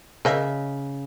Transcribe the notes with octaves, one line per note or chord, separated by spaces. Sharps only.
C#3 A#4 D#5 E5